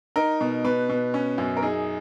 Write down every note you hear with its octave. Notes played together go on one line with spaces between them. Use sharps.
D#4 A#4
B2
B2 B4
B2
C#4
F#2
A#4
D#4 G#4